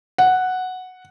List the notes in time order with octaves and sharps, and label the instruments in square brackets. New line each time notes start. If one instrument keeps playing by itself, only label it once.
[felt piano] F#5